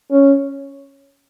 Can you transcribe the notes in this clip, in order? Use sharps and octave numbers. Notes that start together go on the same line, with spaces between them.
C#4